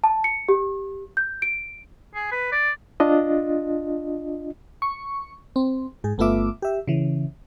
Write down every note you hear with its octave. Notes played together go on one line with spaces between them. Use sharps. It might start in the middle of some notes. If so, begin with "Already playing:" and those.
A5
C#7
G4
G6
D7
G#4
B4
D5
D4 F4 D#5
C#6
C4
G#2 G#4
G1 A3 B3 F4 E5 D6
G4 E5
C#3 E3